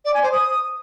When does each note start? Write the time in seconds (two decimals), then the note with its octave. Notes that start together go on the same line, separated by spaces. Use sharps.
0.05 D5
0.14 G#5
0.23 C5
0.32 D#6